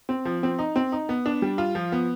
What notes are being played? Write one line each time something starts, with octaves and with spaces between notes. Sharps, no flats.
C4
F3
C4
D#4
C4
D#4
B3
D4
G3
F4
F3
B3